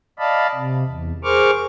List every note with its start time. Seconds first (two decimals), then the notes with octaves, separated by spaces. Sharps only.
0.19 D5 D#5 F5 A5 B5
0.54 C3
0.88 E2
1.24 G#4 A#4 C5 C#6 D6 F6